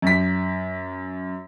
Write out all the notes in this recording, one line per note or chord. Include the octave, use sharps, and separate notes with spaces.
F#2 B6